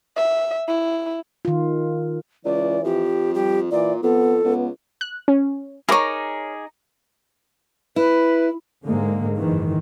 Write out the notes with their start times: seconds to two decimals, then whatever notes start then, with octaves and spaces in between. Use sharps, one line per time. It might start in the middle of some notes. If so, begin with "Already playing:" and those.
0.17 E5
0.68 E4
1.45 D#3 F4
2.45 C#2 E3 D5
2.84 F2 G4
3.34 G3 G4
3.71 A#2 E3 D5
4.03 F2 B3 A4
4.44 C#2 B3
5.01 F#6
5.28 C#4
5.89 D#4 E4 G#4 A#4 C#5 D6
7.96 E4 B4
8.86 G#2 D3 G#3 A#3
9.38 F#1 G#2 D#3 E3